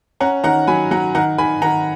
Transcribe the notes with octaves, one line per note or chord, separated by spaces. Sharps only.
C#4 F#5 A#5
D#3 F#5 A#5
F#3 G#5 B5
F#3 F#5 A#5
D#3 F#5 A#5
D#3 G#5 B5
D#3 F#5 A#5